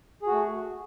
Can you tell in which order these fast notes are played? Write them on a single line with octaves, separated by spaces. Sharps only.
G#4 F#4 A3